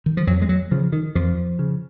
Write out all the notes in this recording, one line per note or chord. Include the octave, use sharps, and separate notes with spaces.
D#3
F3
F2 F#3
G#3
F#3
C#3 F3
D#3
F2 F3
C#3